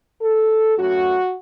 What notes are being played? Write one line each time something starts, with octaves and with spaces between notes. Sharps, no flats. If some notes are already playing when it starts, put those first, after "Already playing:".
A4
F#2 F#3 A3 F#4